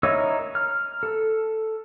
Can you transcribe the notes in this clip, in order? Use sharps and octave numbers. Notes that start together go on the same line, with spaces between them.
D#4 E4 A#4 C#5 E6
F6
A4